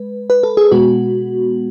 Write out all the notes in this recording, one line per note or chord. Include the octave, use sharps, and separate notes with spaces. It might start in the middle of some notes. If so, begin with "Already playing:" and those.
Already playing: G#3 B4
B4
A4
G#4
B2 G#3 B3 F#4